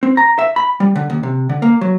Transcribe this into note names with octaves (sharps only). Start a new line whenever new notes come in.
C4
A#5
E5
B5
G3
D3
D#2
C3
D3
A#3
F#3